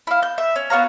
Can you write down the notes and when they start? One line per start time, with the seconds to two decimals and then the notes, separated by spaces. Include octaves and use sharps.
0.07 E4 F5
0.23 G6
0.38 E5
0.56 C#4
0.70 B3 F#4 F5 A#5